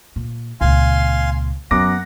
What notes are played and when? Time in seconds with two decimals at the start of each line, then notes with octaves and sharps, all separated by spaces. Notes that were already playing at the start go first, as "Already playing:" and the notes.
0.16 A#2
0.61 C#2 A#2 F5 G#5 C6
1.71 F#2 B3 F#5 D6 A#6